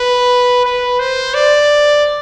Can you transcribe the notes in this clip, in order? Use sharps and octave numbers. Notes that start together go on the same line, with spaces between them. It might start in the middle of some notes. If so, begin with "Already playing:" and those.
Already playing: B4
B4
C5
D5